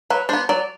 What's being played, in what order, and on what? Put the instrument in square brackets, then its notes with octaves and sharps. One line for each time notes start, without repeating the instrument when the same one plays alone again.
[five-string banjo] F#3 B4
B3 D4 C5
F#3 D5